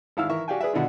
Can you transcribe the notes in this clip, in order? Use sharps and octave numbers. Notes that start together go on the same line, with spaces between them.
G#1 E4 F5 E6 F6
E3 A#4 E5 C#6
F#4 G4 D5 F5 G5 G#5
G#4 B4 D5 E5
B2 D3 D4 E4 F4